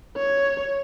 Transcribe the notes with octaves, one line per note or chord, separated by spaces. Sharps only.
C#5